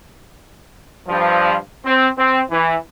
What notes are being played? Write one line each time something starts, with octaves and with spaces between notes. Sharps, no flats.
G2 F3
C4
C4
E3